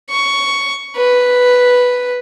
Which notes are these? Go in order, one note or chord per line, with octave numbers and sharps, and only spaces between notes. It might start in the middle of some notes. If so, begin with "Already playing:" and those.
C#6
B4